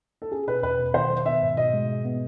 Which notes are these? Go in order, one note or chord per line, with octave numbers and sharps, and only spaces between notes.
A4
C#4 G#4
B2 B4
E2 B4
B2
D#3 C5
F#3
B3 E5
G#2
B2 D#5
G#3
G#3
B3